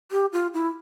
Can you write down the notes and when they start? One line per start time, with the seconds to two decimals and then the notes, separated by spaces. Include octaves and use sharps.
0.12 G4
0.33 F4
0.54 E4